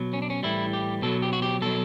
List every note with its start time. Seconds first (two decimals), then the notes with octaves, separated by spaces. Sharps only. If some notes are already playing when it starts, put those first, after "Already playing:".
Already playing: B2 F#3
0.13 C#4
0.22 D4
0.30 C#4
0.43 A2 E3 G3 E4
0.73 G4
1.02 B2 F#3 A4
1.22 G4
1.33 F#4
1.42 G4
1.61 B2 F#3 A4